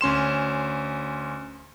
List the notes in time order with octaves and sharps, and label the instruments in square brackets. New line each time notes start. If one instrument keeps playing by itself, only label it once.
[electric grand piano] D2 C#4 C6 E7